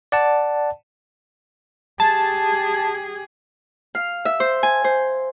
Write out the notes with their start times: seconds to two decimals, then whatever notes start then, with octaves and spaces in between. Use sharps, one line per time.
0.12 D5 F#5 A5
2.00 G4 G#4 A5
3.95 F5
4.25 E5
4.40 C5
4.63 G#5
4.84 C5